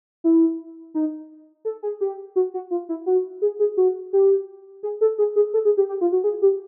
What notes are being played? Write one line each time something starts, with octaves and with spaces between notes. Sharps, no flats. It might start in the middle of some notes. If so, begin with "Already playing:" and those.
E4
D#4
A4
G#4
G4
F#4
F#4
F4
E4
F#4
G#4
G#4
F#4
G4
G#4
A4
G#4
G#4
A4
G#4
G4
G4
F4
F#4
G#4
G4